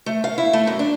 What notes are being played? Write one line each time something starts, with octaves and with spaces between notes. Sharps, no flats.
A3
F5
E4
A3
F#2
D4